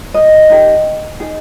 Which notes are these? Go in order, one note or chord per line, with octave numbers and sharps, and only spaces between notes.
D#5
D#4 G4 A#4
D#4 G#4